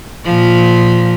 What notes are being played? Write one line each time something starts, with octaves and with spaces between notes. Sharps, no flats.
A#2 F3